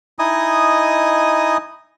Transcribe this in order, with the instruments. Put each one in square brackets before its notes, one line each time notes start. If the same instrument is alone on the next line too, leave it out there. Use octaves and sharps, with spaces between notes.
[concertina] D#4 E4 D#5 G#5 D#6